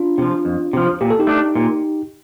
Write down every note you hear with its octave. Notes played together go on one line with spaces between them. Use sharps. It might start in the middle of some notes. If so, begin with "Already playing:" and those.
Already playing: D4 F4
C3 F3
F2
C3 F3
A#2 G4
A4
D#4 G4
A3 D4
A#2